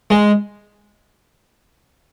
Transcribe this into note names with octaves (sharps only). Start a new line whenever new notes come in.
G#3